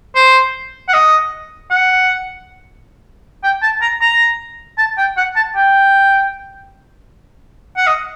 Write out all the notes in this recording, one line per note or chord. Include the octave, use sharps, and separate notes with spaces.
C5
F#5
D#5
F#5
G5
A5
A#5
A#5
A5
G5
F#5
A5
G5
F#5
D#5